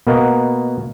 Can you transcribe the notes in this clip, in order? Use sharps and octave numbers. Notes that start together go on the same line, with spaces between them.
B2 A#3 B3 A#4 D#5 F#5